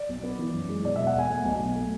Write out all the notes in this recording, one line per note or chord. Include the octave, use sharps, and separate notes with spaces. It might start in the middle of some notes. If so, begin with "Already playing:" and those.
Already playing: D5
B1
B3
E3
F#2
G#3
B2 D5
E1 E5
F#5
E1 G#5
A3
B1
B1
A3